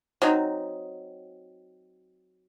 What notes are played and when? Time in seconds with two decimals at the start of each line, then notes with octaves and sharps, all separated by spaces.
0.22 F#3 C4 D#4